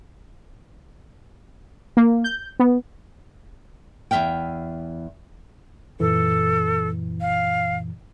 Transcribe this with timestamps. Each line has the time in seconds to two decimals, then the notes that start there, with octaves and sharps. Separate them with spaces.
1.97 A#3
2.24 G6
2.59 B3
4.11 E2 G#3 E5 F5 G5
6.00 F#2 A#2 E3 A4
7.21 F5